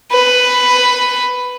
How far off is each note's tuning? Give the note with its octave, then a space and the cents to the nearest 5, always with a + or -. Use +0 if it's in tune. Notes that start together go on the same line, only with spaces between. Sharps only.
B4 +10